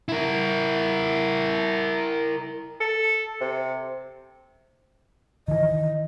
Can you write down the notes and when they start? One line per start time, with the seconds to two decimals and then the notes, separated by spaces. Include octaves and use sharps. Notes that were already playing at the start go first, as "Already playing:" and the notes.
0.08 E4 A#4
2.80 A4
3.40 C3
5.48 D#3 E3 D#5